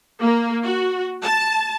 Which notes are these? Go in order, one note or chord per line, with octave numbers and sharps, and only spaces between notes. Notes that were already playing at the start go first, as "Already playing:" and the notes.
A#3
F#4
A5